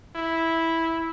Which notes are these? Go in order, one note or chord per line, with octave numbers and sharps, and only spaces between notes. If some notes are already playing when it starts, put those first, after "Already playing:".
E4